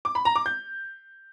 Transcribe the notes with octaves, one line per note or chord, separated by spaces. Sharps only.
D6
B5
A#5
D6
G6